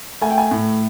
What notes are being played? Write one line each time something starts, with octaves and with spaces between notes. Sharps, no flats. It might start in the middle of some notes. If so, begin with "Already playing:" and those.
A3 G#5
G5
G#5
A2